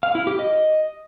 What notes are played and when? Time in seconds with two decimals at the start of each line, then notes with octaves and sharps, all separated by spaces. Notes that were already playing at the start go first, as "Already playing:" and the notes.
0.03 F5
0.15 E4
0.27 G4
0.39 D#5